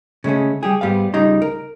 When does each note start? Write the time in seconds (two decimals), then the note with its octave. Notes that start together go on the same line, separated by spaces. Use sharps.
0.24 C#3 G#3 A3 C#4
0.63 G3 G4 G#4
0.81 G#2 G3 B3 F5
1.14 C#2 C#3 G3 D#4 C6
1.42 A#4